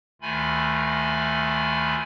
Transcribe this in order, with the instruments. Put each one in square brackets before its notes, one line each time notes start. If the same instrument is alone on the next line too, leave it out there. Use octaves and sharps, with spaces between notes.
[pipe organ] D2 D#3 A3 F4 G#5 B5